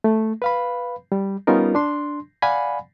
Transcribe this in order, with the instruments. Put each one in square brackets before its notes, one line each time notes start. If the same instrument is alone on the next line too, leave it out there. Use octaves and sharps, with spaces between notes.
[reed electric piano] A3
B4 F5 B5
G3
G3 B3 C#4 D#4 F4 A#4
D4 C6
D5 F5 F#5 G#5 B5